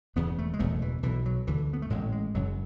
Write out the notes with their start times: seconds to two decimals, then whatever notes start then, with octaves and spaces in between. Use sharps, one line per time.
0.16 E1 E2 C#3 B3
0.38 A3
0.53 G#3
0.59 F#1 E2 B2 A3
0.82 E3
1.03 B1 B2 E3
1.26 F#3
1.47 D2 D3 E3
1.73 B3
1.82 A3
1.90 A1 A2 G#3
2.12 G#3
2.35 F#1 F#2 C#3 F#3